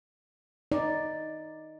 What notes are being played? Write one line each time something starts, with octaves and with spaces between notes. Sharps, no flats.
D#4 D5